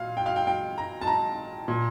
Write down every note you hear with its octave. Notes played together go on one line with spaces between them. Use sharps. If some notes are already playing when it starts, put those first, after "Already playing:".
Already playing: A#2 F5
G5
F5
G5
G5
A#5
A5
A#5
A#2